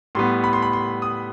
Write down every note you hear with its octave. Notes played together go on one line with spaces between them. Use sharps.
A2 G3 B3 C6
B5
C6
B5
C6
D#6